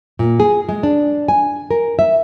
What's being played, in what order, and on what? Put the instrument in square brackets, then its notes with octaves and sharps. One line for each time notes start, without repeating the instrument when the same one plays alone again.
[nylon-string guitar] A#2
G#4
G#3
D4
G#5
A#4
E5